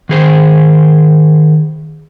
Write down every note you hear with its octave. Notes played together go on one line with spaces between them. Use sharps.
D#3 G#4 C5